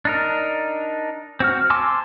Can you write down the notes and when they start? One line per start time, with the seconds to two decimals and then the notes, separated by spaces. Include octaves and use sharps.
0.05 D4 D#4 A#4
1.40 C4 F#4 F6
1.70 G#5 A5 C6 D6 E6